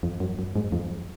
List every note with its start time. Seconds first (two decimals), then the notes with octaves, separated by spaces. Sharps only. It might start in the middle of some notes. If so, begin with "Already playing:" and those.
0.03 F2
0.20 F#2
0.39 F#2
0.56 G#2
0.72 F2